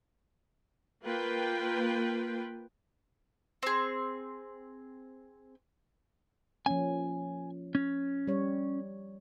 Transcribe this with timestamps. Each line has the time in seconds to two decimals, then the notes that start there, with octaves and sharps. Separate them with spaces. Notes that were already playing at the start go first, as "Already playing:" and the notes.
1.05 A#3 F4 B4 G5
3.63 C4 G#4
6.66 F3 A#3 C#4 G#5
7.75 C#4
8.27 G3 C#5